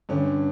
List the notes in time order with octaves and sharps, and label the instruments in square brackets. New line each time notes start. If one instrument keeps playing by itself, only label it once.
[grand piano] G2 D3 C#4